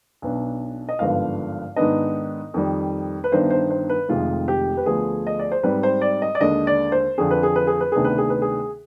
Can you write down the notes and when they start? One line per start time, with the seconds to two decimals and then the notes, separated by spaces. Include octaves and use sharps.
0.22 B1 B2 B3 D4
0.89 D#5
0.99 G#1 G2 D3 F3 B3 F5
1.76 G#2 D#3 B3 D4 D#5
2.54 F2 D#3 G3
3.24 B4
3.31 G1 G2 D#3 B3 D4 C5
3.50 C5
3.70 C5
3.90 B4
4.08 F1 F2 C3 D#3 G#3 F4
4.48 G4
4.77 B4
4.86 D2 D3 F3 B3 G#4
5.27 D#5
5.39 D5
5.51 C5
5.63 G#2 G3 C4 B4
5.83 C5
6.01 D5
6.22 D#5
6.35 D5
6.41 D#2 D3 G#3 D4 D#5
6.67 D5
6.92 C5
7.18 F2 D3 F3 G#4
7.31 B4
7.43 G#4
7.56 B4
7.67 G#4
7.81 B4
7.92 D2 C3 D#3 B3 D4 G#4
8.05 B4
8.18 G#4
8.30 B4
8.42 G#4